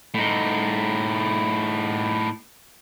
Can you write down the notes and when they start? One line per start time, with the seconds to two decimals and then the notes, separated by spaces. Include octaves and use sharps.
0.14 A2 D#4